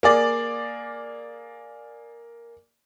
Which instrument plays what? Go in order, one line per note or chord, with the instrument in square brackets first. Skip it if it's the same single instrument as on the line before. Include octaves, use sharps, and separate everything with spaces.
[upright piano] A#3 G#4 D5